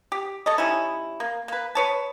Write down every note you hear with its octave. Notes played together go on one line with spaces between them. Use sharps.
G4
A4 C#5 D#5
G3 C#4 D#4 E4
A#3
A#3 B4
B4 C#5 A5